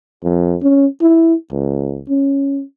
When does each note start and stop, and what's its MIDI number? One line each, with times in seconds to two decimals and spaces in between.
0.23 0.56 41
0.62 0.86 61
1.01 1.34 64
1.52 2.02 37
2.09 2.63 61